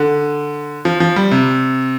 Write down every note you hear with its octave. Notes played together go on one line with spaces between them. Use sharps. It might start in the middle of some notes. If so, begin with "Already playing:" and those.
Already playing: D3
F3
F3
G3
C3